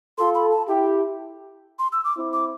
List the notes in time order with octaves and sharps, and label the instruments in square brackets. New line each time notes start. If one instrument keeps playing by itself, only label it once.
[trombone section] F4 A4 [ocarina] C6
[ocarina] B5
A5
[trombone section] E4 G4 [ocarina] G5
[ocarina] C6
E6
D6
[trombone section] C4 E4
[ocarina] D6